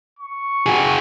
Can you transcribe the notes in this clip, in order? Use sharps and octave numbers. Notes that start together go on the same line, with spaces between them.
C#6
F#4 G#4